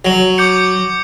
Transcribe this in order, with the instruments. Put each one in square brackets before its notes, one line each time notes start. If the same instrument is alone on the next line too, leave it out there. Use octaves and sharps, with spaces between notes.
[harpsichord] F#3
[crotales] D6 G6 C#7